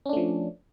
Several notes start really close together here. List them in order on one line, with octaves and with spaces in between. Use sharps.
C#4 D4 A3 F3